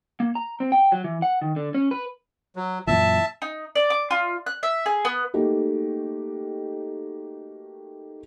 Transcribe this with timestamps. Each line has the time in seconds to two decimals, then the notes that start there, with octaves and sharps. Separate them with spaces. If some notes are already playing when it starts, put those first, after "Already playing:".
0.20 A#3
0.35 A#5
0.60 C4
0.72 G5
0.92 F#3
1.04 E3
1.22 F#5
1.42 D#3
1.56 D3
1.75 C#4
1.91 B4
2.56 F#3
2.87 F#2 A#2 E3 E5 A5
3.42 D#4
3.75 D5
3.90 D6
4.11 F4
4.46 F#6
4.63 E5
4.86 G#4
5.05 B3
5.34 A3 A#3 D#4 F#4 G4